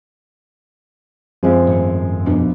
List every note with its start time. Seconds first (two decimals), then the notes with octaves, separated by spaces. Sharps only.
1.43 F#2 F3 G#3 C4
1.67 G#2 D#3 A3
2.26 A#1 E2 B2 F3 D4